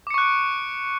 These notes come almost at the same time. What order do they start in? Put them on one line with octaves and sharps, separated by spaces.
D6 C#7 C#6 F#6 D7